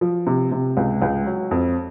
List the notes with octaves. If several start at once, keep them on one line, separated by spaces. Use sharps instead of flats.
F3
C3
C3
C#2
C#2
F#3
F2